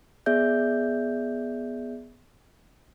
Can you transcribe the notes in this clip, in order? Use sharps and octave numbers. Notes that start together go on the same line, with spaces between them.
B3 G#4 D5 E5 G6